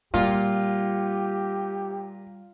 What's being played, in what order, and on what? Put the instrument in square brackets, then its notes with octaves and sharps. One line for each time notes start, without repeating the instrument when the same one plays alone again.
[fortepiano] A#2 [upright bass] G3 [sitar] F4 [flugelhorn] G4